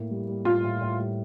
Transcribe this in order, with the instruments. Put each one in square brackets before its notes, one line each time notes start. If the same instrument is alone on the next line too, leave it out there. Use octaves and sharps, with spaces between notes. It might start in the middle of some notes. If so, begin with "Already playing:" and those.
Already playing: [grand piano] A2 A#3
G3
G3
[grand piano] A2 [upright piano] F4
[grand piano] A2
A2
G3